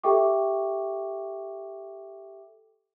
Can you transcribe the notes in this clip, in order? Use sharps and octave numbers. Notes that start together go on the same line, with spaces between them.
G4 A4 E5 G5 C#6 D6